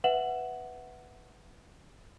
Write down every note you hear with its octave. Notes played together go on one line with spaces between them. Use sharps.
B4 E5 F#5 E7 F#7